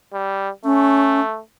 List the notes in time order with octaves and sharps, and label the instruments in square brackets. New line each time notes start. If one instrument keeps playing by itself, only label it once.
[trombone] G3
[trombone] A3 [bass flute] C#4